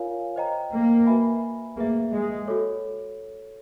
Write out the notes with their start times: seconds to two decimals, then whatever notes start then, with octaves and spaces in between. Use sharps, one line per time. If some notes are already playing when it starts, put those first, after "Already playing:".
Already playing: F4 A#4 C#5 F5 G#5
0.36 C5 D#5 G5 A#5
0.71 A#3
1.06 F#4 B4 E5 G#5 B5
1.77 A#3 G#4 B4 E5
2.12 G#3
2.47 F#4 A4 C#5